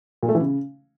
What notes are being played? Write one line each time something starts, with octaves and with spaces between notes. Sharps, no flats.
A#2
A3
E3
C#3